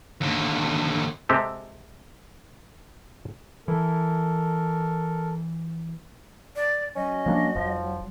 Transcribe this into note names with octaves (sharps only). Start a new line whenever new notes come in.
D#2 D3
C3 G#3 C4 G4 A4
E3 A4 A#4
D5
F#3 C#4 D#5
F3 A#3 D4
F1 F3